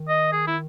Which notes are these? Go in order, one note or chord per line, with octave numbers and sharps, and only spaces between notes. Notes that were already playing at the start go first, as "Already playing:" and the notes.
Already playing: D#3
D#5
G#4
E4